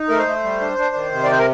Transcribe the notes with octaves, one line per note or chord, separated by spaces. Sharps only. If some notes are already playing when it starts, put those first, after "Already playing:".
Already playing: D#4
A3 A#4
C5
A3
G3
D4
D4
D#3
C3
D5
C5
A#4